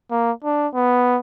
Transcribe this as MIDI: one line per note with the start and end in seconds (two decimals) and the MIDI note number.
0.11 0.32 58
0.44 0.67 62
0.74 1.19 59